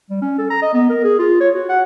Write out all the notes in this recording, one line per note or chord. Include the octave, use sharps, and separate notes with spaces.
G3
C#4
A4
A#5
D#5
B3
A#4
G#4
F4
C#5
F#4
F#5